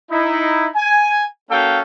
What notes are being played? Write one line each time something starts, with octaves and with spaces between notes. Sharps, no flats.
D#4 E4
G#5
A#3 C#4 F#4 A4 F5 G5